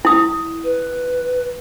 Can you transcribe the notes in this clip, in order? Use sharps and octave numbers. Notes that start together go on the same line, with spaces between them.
E4 D#6
B4